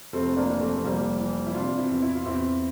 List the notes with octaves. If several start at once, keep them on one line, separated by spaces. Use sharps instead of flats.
F1 A3 C4
A#3 D4
E3
A3 C4
C4
F1 G3 A#3
E3
E4
C3 D4 F4
C4 E4
E2
E4
F4
E2 C4 E4